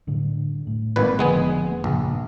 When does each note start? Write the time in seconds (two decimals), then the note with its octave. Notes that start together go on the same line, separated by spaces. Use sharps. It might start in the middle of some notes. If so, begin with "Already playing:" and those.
0.07 A2 D3 G3
0.67 A2
0.96 G#1 A#2 B4
1.19 F1 D3 F3 G#3 B3 G#4
1.72 A#3
1.84 A#1 G2 C#3